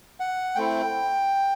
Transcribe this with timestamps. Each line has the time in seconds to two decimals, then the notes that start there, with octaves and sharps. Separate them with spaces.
0.20 F#5
0.55 A3 C4 E4 G5